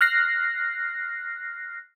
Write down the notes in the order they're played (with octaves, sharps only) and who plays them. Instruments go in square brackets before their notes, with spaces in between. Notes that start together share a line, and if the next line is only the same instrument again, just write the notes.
[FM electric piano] F6 F#6 A#6 C7